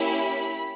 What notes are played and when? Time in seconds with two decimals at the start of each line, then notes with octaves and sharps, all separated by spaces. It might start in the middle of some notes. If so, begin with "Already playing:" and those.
Already playing: A#3 C#4 E4 G4
0.17 B5